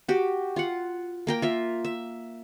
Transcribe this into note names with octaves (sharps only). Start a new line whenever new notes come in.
F#4 G4
F4 F#5
A#3 A#4 G5
F4 E5
E5